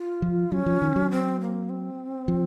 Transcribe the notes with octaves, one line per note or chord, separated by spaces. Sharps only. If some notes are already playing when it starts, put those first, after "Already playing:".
Already playing: F4
F3
F#3 C#4
F3
D#3
F#3
C4
A#3
C4
F3